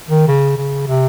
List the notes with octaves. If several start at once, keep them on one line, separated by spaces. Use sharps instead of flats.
D#3
C#3
C#3
C3